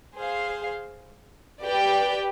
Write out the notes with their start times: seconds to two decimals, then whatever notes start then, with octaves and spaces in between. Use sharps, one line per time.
0.17 G#4 C5 F5
1.64 G4 B4 D5 G5